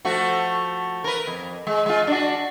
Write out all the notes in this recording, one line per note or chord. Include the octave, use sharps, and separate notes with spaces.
F3 A3 F#4
A#4 B4
F2
G#3
G#3 F4
D4 F#4